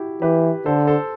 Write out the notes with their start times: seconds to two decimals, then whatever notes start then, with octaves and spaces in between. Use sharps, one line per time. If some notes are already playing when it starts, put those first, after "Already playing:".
Already playing: E4 F#4 G4
0.22 E3 G4 B4
0.66 D3 A4 C5
0.87 A4 C5